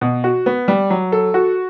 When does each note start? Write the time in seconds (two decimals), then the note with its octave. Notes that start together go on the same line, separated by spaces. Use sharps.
0.01 B2
0.24 F#4
0.46 B3
0.68 G3
0.90 F#3
1.12 A4
1.34 F#4